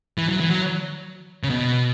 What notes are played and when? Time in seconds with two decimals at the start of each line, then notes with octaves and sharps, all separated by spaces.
0.18 E3
0.29 F#3
0.40 E3
0.51 F#3
1.44 C#3
1.50 B2